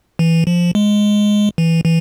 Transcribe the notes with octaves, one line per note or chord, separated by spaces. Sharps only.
E3
F3
G#3
E3
E3